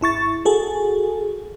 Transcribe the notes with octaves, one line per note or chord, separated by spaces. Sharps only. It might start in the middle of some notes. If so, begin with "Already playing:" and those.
G#1 E4 C#6 A6
F#4 G#4 A4